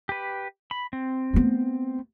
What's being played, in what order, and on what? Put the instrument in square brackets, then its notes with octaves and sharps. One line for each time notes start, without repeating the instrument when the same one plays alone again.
[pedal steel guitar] G4 B4
B5
C4
[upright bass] A3 B3